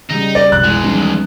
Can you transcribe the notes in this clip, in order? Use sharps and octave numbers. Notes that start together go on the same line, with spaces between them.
C#3 G3 D#4
D5
B1 F2 F#6
E2 G#3 E4
D#2 F3 G3 C#4